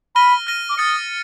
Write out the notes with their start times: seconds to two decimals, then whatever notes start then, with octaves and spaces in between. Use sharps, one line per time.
0.15 B5 F6 A#6 D#7 G7
0.47 F6 A#6 D#7 G7
0.69 D6
0.78 D#6 F6 A6 C#7